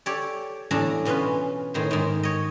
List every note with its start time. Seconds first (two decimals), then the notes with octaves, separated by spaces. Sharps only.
0.06 G4 A4 C#5 D5
0.71 E2 A2 D4 A4 A5 A#5
1.05 E2 B2 C#4 F4 B4
1.74 A2 D#3 C5
1.91 G#2 D#3
2.23 C#5 D#5